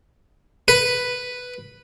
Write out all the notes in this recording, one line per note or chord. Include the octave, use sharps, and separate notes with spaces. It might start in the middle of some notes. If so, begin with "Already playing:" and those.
B4